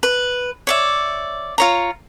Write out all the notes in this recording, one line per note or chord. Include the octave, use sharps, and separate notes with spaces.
B4
C#5 D5 E5
F4 C#5 A#5